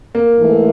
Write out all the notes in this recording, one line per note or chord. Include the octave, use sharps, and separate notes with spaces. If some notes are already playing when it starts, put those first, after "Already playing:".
A#3
G#2 E3 A3